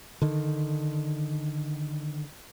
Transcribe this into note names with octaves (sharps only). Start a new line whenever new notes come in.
D3 D#3